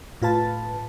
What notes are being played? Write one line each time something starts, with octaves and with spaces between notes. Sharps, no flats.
A2 F4 B4 A5